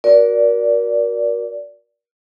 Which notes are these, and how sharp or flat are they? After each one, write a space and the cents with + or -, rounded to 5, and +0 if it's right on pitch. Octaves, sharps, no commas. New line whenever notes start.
F#4 +0 A#4 +25 D5 -15